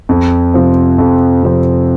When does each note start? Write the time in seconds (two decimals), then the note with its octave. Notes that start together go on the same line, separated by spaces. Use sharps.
0.09 F2
0.54 C3 F3 C4
0.98 F2
1.43 C3 F3 C4